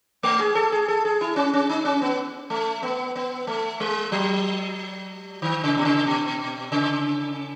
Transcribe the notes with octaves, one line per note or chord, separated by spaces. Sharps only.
A3
G#4
A4
G#4
A4
G#4
E4
C#4
C#4
D#4
C#4
B3
A3
B3
B3
A3
G#3
F#3
D#3
C#3
B2
C#3
B2
C#3